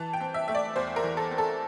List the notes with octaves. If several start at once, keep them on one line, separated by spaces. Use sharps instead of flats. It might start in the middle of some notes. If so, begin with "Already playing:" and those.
Already playing: E3 A5
G5
C4
E5
A3 E5
D5
E2 C5
A#4
E3
A4
C4
A4